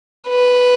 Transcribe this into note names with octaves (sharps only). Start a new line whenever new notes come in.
B4